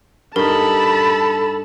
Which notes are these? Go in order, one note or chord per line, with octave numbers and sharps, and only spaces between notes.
G2 D#4 A4 A#4 A5 B5